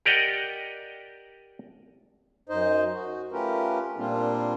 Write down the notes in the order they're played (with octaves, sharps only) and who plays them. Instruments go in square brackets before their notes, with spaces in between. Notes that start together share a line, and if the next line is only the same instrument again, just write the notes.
[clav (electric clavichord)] G4 A#4 D5 D#5 F#5 G5
[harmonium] F#2 D#4 C5 D#5
F#4
A3 C#4 F4 G4 A#4 B4
A#2 G3 A#3 C4 D4 F4